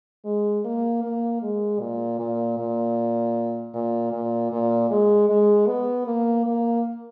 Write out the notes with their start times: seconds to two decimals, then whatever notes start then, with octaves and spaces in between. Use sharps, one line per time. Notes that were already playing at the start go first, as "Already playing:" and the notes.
0.25 G#3
0.64 A#3
1.03 A#3
1.42 G#3
1.80 A#2
2.19 A#2
2.58 A#2
3.74 A#2
4.12 A#2
4.52 A#2
4.90 G#3
5.29 G#3
5.67 B3
6.06 A#3
6.46 A#3